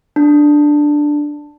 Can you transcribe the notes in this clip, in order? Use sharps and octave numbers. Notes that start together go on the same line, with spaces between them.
D4